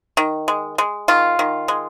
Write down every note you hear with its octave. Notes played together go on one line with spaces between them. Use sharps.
D#3
G#3
G#3
D#3 F4
D#3
G#3